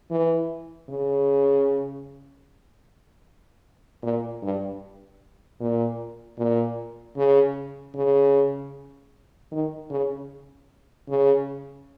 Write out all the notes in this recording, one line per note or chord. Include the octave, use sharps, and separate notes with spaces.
E3
C#3
A#2
G2
A#2
A#2
C#3
C#3
D#3
C#3
C#3